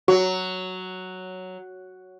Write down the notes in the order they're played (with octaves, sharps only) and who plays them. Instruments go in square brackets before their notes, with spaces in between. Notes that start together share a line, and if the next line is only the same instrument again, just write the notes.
[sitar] F#3 [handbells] F#4